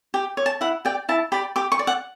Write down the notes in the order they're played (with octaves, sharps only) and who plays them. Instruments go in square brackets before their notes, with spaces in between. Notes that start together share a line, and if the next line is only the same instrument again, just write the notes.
[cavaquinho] G4
C#5
A5
E4 F#5
G4 D5 G5
E4 A5
G4 D5 B5
G4 D6
C#6
D5
F#5